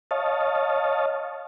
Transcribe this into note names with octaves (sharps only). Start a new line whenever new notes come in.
C#5 D#5 F5 A5